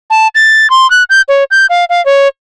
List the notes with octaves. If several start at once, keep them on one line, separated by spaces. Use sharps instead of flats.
A5
A6
C6
F#6
G6
C#5
G6
F5
F5
C#5